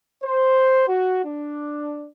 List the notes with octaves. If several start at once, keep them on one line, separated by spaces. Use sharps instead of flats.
C5
F#4
D4